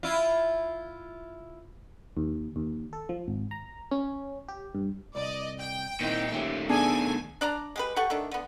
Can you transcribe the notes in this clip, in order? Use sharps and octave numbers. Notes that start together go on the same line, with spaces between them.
E4 F4
D#2
D#2
A4
F3
G#1
A#5
C#4
G4
G2
C2 D5 D#5
G5
A#2 D#3 C4 D#4 E4
A#2 D#3 A3 C#4 G4
B2 D4 G#4 A4 G#5
D4 D5 A5 A#5
G#3 G4 B4
G4 A4 F#5 C#6
D#3 A3 D4
D3 B3